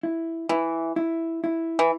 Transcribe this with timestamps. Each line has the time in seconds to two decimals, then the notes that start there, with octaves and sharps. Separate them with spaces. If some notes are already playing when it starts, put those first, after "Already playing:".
0.03 E4
0.49 E3 E4
0.96 E4
1.44 E4
1.79 E3